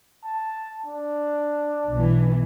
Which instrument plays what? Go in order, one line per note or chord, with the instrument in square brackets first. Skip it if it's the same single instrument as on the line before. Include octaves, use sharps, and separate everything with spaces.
[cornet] A5
D4
[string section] B1 B2 E3